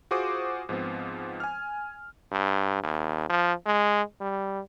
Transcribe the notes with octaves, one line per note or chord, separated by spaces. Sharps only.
F4 F#4 G#4 C5 D6 D#6
G#2 F3 B3 C4
G#5 F6
G2
D#2
F3
G#3
G3